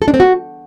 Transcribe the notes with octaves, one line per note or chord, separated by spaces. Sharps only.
A4
D4
C4
F#4